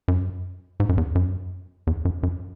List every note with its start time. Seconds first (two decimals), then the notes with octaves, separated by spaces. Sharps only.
0.08 F#2
0.80 G#2
0.89 F#2
0.98 E2
1.15 F#2
1.87 E2
2.05 F#2
2.23 F#2